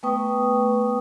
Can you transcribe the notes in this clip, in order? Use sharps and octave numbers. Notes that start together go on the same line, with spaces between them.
A3 B3 B4 G5 C#6 D#6